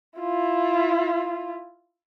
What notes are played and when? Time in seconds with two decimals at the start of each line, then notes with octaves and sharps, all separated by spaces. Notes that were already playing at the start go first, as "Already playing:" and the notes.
0.20 E4 F4